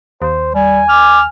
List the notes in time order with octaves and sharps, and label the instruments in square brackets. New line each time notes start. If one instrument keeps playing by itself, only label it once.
[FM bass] D#2 [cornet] C5
[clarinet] G3 [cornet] G#5
[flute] D6 [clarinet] F6